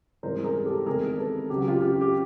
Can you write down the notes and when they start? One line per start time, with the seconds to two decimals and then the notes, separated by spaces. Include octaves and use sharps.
0.23 G#2 E3 G3 C4 A#4 C5
0.44 G#4 A#4
0.66 G4 A4
0.86 E2 C3 D#3 G#3 G#4 A#4
1.18 A4 B4
1.50 C#2 C#3 F#3 G4
1.58 F#4
1.68 F4 G4
1.81 F4 G4
2.01 G4